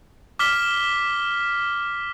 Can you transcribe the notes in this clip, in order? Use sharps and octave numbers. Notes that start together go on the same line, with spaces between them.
D6 F6 B6 G7